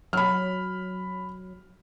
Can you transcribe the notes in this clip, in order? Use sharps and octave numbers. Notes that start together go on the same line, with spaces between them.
F#3 B5 F6